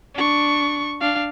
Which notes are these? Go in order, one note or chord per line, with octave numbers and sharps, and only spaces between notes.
D4 C#6
D4 F5